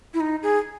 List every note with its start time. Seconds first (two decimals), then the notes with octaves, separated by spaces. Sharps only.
0.14 E4
0.20 D#4
0.43 G#4